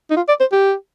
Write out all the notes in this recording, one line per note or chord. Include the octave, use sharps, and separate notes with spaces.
D#4
F4
D5
C5
G4